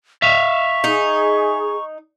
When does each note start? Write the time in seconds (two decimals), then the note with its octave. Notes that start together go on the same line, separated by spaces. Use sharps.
0.22 E5 F5 C#6
0.84 D#4 G#4